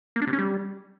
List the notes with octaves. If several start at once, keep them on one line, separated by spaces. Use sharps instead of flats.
A#3
D4
C3
C#4
G3